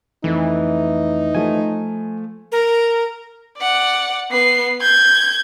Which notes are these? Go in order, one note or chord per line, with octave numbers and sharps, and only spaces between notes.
F2 E3 A3 D#4
F3 A3 G#5
A#4
D5 F#5
B3 C7
G6 G#6